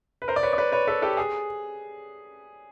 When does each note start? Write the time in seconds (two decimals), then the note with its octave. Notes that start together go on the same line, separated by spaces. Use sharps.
0.22 B4
0.28 A#4 C5
0.36 D5
0.43 B4 C#5
0.53 D5
0.58 B4 C#5
0.72 B4 C#5
0.87 A4 B4
1.02 G4 A4
1.17 G#4